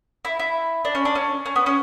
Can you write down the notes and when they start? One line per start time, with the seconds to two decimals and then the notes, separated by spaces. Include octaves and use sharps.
0.25 E4
0.39 E4
0.85 D4
0.95 C#4
1.05 D4
1.15 C#4
1.46 C#4
1.56 B3
1.66 C#4